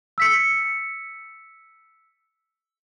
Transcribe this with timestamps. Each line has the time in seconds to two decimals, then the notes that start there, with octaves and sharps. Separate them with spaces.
0.18 E6 B6 C#7